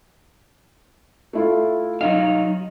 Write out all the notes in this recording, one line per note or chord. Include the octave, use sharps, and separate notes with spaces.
A3 E4 F4
F#3 D#4 D#5 F5